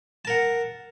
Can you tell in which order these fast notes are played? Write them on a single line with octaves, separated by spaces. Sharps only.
A5 A#4 F#5